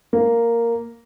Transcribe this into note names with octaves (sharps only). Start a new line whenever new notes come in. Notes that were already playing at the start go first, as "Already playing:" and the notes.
A#3